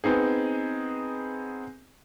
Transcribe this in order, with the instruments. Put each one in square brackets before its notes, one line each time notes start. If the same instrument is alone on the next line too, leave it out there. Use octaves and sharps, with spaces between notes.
[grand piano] B3 C4 D#4 G#4